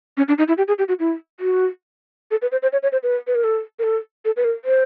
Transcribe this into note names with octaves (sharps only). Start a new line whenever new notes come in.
C#4
D4
D#4
E4
G4
G#4
G4
F#4
E4
F#4
A4
B4
C5
C5
C#5
C#5
C5
B4
B4
A#4
A4
A#4
A4
A4
B4
A#4
C5